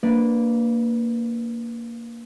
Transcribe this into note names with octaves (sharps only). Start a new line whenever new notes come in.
A#3 D4 B4 D5